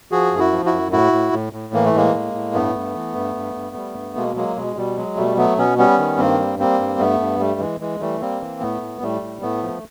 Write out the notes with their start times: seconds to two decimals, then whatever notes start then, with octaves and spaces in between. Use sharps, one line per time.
0.11 F3 F#4 G#4
0.32 F#2
0.39 E4 F#4
0.52 F3
0.66 E4 F#4
0.72 F#2
0.92 A2 E4 F#4
1.12 A2
1.33 A2
1.53 A2
1.73 E3 A#3
1.85 A3
1.94 A2 G#3 A#3
2.14 A2
2.34 A2
2.54 G2 A3 B3
2.75 G2
2.95 E3
3.15 G2
3.35 G2
3.55 G2
3.76 G3
3.96 G2
4.16 B2 G#3 A#3
4.36 F#3 G#3 A#3
4.56 B2 G#3
4.77 B2 G3
4.97 F#3 G#3
5.17 B2 G3 A3
5.37 F#3 A3 B3
5.58 B2 B3 C#4
5.78 G3 B3 C#4
5.98 D#3
6.18 G2 A#3 C4
6.39 G3
6.59 G3 A#3 C4
6.79 G2
6.99 G2 A3 B3
7.20 G2
7.40 G3 A3
7.60 E3 G#3
7.80 E3 G#3
8.00 E3 G3 A3
8.21 G3 A#3 C4
8.41 E3
8.61 A2 A3 B3
8.81 A2
9.01 A2 G3 A3
9.21 A2
9.42 A2 A3 B3
9.63 F3